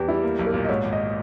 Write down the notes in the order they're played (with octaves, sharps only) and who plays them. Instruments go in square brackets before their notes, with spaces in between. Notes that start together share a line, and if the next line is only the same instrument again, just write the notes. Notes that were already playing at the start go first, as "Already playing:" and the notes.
Already playing: [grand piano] E2 [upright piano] G4 B4
[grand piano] G3 [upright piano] E4
[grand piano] A#3
B1
[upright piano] A#4
[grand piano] A#2
[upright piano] D#5
[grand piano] G#2 [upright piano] C#5
[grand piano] G#1
[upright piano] D#5